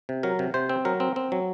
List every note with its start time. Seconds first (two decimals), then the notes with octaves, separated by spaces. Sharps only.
0.09 C3
0.23 F#3 A#4
0.39 C3
0.54 C3 C5
0.70 C4
0.85 F#3 A#4
1.00 C4
1.16 C4
1.32 F#3